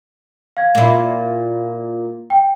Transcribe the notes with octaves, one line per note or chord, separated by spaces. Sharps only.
F5 G#6
A#2 E4
G5